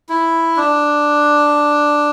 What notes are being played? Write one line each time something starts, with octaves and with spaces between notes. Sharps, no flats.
E4
D4